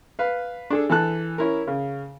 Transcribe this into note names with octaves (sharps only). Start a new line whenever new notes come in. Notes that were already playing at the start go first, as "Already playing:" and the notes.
B4 F5
D4 G#4 A4
E3 A4 A5 F#6
C#4 E4 A#4
C#3